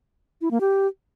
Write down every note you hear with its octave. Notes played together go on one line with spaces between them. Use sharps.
E4
A#3
G4